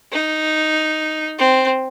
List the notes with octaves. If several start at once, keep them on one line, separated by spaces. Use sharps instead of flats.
D#4
C4